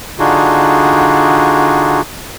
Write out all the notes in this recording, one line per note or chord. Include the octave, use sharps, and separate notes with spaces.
D3 D4 D#4 F4 F#4 G#4